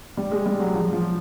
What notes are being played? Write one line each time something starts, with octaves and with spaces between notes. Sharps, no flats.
G3
G#3
G3
F#3
F3
F3